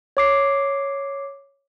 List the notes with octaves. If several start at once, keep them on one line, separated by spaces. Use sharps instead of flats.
C#5 D6 C7